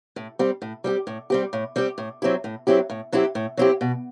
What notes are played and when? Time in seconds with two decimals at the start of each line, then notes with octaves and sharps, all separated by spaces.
0.16 A2
0.39 G3 C4 G4
0.62 A2
0.84 G3 C4 G4
1.07 A2
1.30 G3 C4 G4
1.53 A2
1.76 G3 C4 G4
1.98 A2
2.22 F#3 C4 E4 G4
2.44 A2
2.67 F#3 C4 E4 G4
2.90 A2
3.12 F#3 C4 E4 G4
3.35 A2
3.57 F#3 C4 E4 G4
3.81 B2